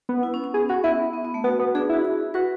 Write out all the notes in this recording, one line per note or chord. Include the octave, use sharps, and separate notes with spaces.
B3
E4
C#4
C#4
B3 G#4
C#4 F#4
B3 E4
B3
B3
A3
B3 F#4
B3
D4 G#4
E4 F#4
G#4
F#4 B4